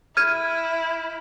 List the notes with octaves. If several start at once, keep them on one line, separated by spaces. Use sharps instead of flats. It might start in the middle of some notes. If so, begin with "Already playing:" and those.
E4 F6 G#6 D#7